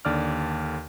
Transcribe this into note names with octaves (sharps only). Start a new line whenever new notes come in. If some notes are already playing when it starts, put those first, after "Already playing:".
D#2 D3 D5 D6 F6